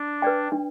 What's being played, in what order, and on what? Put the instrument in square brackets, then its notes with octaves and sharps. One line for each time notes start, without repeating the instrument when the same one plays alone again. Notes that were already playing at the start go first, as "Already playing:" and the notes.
Already playing: [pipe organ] D4
[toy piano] B4 D5 G5
D4